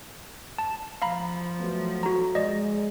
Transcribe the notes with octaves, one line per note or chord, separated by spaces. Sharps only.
A5
F3 F5 A#5 B5
F#3 A3 B3
F#4 A#5
G#3 D5 D#5